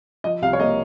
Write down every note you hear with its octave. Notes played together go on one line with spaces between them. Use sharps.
F3 D#5
C2 F5
C#5
A#3 D#5